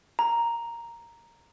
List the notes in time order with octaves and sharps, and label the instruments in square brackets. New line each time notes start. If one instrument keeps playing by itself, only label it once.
[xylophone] A#5